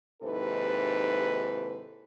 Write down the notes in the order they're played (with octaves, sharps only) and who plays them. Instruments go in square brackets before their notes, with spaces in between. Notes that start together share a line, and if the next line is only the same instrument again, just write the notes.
[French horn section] D#2 G#2 C3 E4 A4 B4